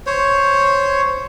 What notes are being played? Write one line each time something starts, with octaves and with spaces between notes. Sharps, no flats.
C5 C#5